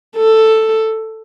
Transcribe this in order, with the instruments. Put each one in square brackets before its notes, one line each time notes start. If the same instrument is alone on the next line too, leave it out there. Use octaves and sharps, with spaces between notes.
[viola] A4